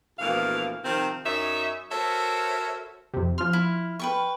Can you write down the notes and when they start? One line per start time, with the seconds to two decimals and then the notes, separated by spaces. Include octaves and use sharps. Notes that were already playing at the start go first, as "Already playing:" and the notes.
0.19 D2 B2 E3 F3 A#3 F5
0.85 C3 D#3 F3 C4
1.26 F#2 C#4 D#4 C#5 E5
1.91 F#4 A4 A#4 C5 C#5 E5
3.14 F2 C3
3.38 F3 C6 F6
3.53 E4
4.00 B4 G5 C#6